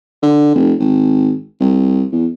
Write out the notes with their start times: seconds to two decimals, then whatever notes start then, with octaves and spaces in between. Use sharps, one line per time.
0.23 D3
0.55 F1
0.79 G#1
1.60 C2
2.12 E2